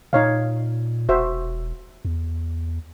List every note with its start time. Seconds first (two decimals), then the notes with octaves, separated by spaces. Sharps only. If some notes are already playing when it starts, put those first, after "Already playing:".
0.13 A#2 D#4 C#5 F5
1.09 E1 F#4 C5 E5
2.05 E2